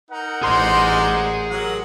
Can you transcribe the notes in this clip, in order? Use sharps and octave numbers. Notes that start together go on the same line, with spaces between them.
D#4 A#4 F#5
A1 D#4 G#4 C5 D5 C6
F#3 G4 A#4 F#5